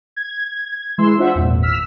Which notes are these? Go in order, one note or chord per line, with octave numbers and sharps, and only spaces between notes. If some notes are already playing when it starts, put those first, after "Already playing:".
G#6
E3 G#3 C6 E6
C#4 D4 F4 C5 E5 F#5
G#1 E2 A#2
E6 F6 B6